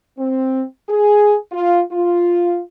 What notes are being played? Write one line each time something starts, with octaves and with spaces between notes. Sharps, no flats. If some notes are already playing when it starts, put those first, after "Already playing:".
C4
G#4
F4
F4